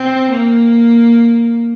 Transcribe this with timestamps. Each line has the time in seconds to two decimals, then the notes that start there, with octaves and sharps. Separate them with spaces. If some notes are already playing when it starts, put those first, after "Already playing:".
Already playing: C4
0.31 A#3